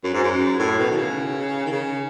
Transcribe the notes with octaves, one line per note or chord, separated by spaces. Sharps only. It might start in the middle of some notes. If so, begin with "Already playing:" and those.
F#2
G#2
F#2
A2
B2
D#3
C#3
D#3
C#3